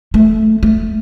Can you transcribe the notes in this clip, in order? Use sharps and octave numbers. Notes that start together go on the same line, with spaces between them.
A3
A3